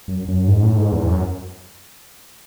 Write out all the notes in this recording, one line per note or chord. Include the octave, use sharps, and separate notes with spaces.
F#2
F#2
G#2
A2
G#2
E2
F#2